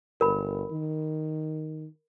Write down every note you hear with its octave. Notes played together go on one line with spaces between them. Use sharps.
G1 A#4 B5
D#3